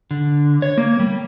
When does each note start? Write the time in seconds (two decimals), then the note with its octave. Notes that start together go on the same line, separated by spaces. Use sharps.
0.11 D3
0.62 C#5
0.78 A#3
1.00 G3